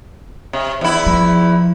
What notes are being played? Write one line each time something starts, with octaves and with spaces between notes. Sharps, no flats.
C3
E2 E4
F3